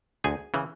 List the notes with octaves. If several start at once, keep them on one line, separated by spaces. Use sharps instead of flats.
D2 G#4 G#5
C#3 E3